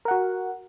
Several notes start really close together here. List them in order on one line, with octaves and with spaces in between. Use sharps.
A#4 F#5 F#4